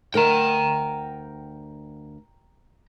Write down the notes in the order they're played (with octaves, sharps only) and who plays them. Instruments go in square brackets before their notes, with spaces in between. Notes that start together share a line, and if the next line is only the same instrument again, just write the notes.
[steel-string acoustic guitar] D2 A#4 F#5 [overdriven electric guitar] G5 A#5